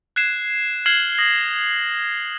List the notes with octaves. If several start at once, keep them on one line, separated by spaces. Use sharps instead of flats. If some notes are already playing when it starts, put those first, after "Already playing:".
F#6 G#6 C7 E7
F6 G#6 C7 E7 F#7 G7
D#6 A#6 F#7